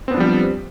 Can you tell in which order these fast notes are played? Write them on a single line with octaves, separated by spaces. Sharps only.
C4 B3 D4 F3 G3